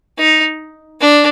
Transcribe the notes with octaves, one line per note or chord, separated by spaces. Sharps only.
D#4
D4